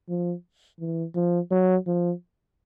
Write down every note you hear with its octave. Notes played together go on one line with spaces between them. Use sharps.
F3
E3
F3
F#3
F3